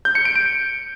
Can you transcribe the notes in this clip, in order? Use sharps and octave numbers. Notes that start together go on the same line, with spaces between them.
G6
C#7
D7
D7